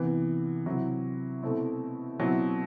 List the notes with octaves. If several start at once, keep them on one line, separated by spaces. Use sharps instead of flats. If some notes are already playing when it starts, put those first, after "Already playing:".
Already playing: C3 E3 B3
C3 F#3 C4 E4
B2 A3 C4 E4
B2 F#3 C4 E4